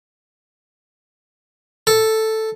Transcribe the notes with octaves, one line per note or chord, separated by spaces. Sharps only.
A4